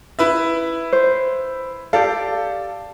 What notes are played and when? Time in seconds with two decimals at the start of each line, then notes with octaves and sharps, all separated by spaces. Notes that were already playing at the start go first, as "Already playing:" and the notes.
0.19 E4 B4 E5
0.93 C5
1.93 G4 A4 D5 F5